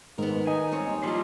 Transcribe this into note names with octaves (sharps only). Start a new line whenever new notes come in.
G#2 D#3 B3 A#4
D#4 G#5
G3 C4 C#5
D#2
F3 G3 F4 C6